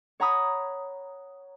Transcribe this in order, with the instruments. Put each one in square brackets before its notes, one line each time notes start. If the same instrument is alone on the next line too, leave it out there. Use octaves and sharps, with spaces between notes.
[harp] C#5 F#5 A#5 B5 D#6